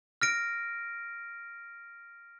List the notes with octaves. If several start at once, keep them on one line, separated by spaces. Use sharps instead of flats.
F6 A#6 D7